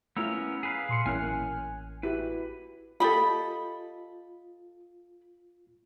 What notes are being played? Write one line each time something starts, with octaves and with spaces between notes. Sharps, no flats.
A3 B3 C#4 E4 F4 A#4 E6
G#4 B4 F5
A#2 C6 C#7
A1 A#3 C#4 E4 G#5 F6 F#6
E4 F#4 G4 B4
F4 G4 A4 D#5 B5